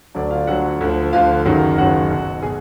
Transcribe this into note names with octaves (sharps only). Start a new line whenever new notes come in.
D2 D3 F#3 D4 D5
F4 F5
D2 D3 F#3 F#4 F#5
D2 D3 F3
D2 D3 F3 F4 F5
F#1 F#2 D#3 F#3
F#1 F#2 D#3 F#3 F#4 F#5
B1 B2 F#3
B2 G#4 G#5